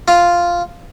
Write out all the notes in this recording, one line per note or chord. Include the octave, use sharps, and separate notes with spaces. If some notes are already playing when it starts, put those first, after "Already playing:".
F4